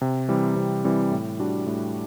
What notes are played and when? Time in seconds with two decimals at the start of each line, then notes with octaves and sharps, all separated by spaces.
0.01 C3
0.28 E3 G3 C4
0.56 C3
0.84 E3 G3 C4
1.11 A2
1.39 G3 D4 F#4
1.66 A2